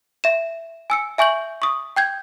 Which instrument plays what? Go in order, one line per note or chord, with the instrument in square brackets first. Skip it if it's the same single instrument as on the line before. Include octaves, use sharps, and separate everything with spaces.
[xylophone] E5 E7
G#5 E6 C#7
E5 G#5 C#6 G6 F#7
C#6 D#6
G5 G6 G#6